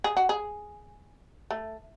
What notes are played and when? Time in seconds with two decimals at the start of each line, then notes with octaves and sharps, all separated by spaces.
0.04 G#4
0.17 F#4
0.29 G#4
1.51 A3